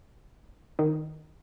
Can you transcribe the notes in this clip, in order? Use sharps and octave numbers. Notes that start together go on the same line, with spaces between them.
D#3